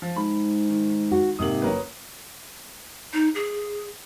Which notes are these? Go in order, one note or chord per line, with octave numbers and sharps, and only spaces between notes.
F3
G#2 B5
D#3
F#4
G#2 C3 A#3 D#6 F#7
F#1 F#3 A#4 B4
D#4
G#4